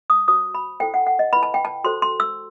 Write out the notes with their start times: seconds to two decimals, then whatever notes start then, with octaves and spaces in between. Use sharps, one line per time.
0.10 D#6
0.28 F#4 C5 D#6
0.55 B5
0.80 E4 A4 C5 G5
0.94 F#5
1.07 F#5
1.19 D#5
1.33 E4 B4 B5
1.43 A5
1.54 G5
1.65 A5
1.84 F#4 A4 C5 C6
2.02 C6
2.20 E6